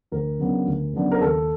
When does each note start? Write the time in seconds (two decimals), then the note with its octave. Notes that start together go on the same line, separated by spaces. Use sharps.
0.12 D2 A#4
0.40 C#3 F#3 B3 D4
0.67 D2
0.94 C#3 F#3 B3 D4
1.12 A#4
1.21 D#2 A4